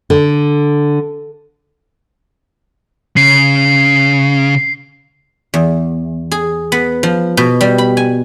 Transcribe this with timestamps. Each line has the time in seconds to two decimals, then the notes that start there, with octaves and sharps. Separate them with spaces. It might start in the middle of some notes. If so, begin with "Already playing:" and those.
0.10 D3
3.17 C#3 C7
5.54 E2
6.31 G#4
6.72 B3
7.03 F3
7.37 B2
7.61 G3
7.78 B5
7.97 G#5